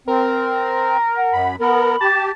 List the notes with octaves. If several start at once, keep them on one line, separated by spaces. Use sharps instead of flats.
C4 A#4
F#5
F#2 B5
B3 A#4 B5
G4 A5